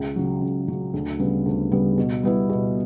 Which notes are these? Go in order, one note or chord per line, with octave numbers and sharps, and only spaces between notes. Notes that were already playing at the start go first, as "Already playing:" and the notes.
Already playing: C#2
C#3 F#3
C#2
C#3 F#3
D2
C#3 G3 B3
D2
C#3 G3 B3
B2
G3 B3 E4
B2